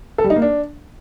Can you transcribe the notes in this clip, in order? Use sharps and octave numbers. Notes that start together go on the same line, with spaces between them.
A4
G3
D#4
A#3
D4